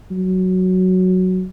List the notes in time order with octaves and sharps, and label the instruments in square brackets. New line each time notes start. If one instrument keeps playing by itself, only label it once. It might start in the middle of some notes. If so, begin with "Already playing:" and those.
[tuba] F#3